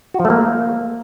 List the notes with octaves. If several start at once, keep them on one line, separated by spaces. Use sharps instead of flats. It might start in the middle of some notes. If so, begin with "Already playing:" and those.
F#4
F3
A3
A#3